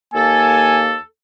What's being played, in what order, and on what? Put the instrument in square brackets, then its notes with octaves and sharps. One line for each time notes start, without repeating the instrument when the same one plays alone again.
[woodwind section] D#2 A#3 A4 [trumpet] G#5